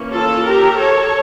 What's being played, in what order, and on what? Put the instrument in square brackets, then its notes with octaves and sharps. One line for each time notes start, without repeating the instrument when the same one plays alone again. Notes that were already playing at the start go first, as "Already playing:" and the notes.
Already playing: [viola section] E3 A#3 C#4
F4 A4
G4 A#4
A4 C#5